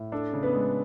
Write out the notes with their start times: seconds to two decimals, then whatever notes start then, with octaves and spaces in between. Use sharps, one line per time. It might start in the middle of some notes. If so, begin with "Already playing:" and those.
Already playing: A2
0.12 D4 A4
0.33 C#3
0.43 B3 B4
0.54 G#3